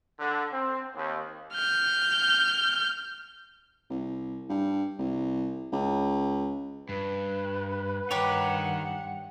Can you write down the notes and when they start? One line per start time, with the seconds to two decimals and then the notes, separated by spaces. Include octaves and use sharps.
0.20 D3
0.53 C4
0.96 D#2
1.54 F6 G6
3.90 C2
4.49 G2
4.99 C2
5.72 C#2
6.89 G2 B4
8.11 G2 D#3 D#4 G4 C#5 F#5